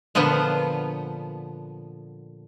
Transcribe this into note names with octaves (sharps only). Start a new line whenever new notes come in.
A#2 D3 F3 B3